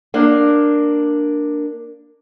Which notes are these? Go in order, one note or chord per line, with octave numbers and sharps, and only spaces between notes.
A#3 D4